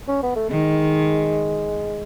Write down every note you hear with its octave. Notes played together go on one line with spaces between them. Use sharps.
C#4
B3
A3
D#3 G#3